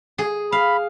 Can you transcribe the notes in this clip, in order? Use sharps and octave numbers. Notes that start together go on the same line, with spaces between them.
G#4
F5 B5